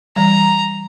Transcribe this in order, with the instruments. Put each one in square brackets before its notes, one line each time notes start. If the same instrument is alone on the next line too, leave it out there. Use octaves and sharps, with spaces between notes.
[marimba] E3 G3 [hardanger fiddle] A#5